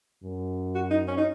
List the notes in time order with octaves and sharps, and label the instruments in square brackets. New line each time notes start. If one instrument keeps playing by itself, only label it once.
[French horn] F#2
[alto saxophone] F#4
D#4
C#4
D#4